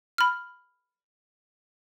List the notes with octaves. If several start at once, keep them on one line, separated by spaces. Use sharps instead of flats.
B5 F6